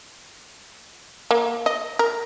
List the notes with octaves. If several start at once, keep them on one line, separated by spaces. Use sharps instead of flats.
A#3
D#5
A#4